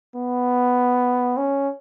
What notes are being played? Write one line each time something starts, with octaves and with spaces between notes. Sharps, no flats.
B3
C#4